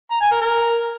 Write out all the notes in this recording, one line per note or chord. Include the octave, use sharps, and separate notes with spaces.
A#5
G#5
A#4
A#4